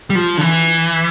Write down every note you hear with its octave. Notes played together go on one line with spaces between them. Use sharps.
G3
F3
D3
E3